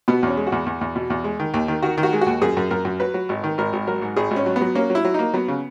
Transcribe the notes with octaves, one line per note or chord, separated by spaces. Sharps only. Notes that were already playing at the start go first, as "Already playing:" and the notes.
B2 B3
E2 C#4
G#3
F#4
E2
E2
E2
B2
E2
G#3
D#3
D#2
D#3
D#3 F#4
D#3
F#4
G#3
D#2 F#4
F#2 G#4
F#2
F#2 A#4
F#2
F#3 B4
F#3
G#1
D#3
G#1 A#4
G#1
F#3 A#4
G#2
G#1 G#4
G#1
C#4
F#3
B3
F#3
A#3 C#4
F#3
E4
F#3
A#3 D#4
F#3 B3
C#3